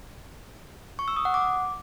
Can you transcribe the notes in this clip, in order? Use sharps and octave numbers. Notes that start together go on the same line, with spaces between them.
C#6
E6
D#6
F#5
D6